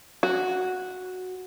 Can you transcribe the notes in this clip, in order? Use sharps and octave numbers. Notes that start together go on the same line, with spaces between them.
F#4